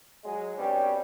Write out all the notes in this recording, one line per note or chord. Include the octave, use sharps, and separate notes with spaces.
F#3 G#3
G2 B2 G3 C4 C#4